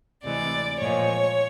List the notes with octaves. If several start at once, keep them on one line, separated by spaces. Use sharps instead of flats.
D2 C3 E3 G#3 D5
A#2 F3 G#3 C#5